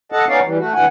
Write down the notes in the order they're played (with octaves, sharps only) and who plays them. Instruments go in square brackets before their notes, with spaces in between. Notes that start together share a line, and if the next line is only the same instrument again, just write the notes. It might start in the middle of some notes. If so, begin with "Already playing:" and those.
[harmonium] A4 D#5 F#5 A5
B3 C#4 D#4 C#5 D5 F5
E3 G3
A3 F#4
D3 E3 F#5 G#5